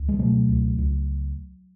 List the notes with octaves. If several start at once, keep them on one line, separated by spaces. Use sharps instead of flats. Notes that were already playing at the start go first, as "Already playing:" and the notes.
Already playing: C#2
G#3
B2 F#3 A3
C#2
C#2